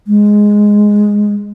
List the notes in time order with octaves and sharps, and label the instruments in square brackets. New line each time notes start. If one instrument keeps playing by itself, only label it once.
[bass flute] G#3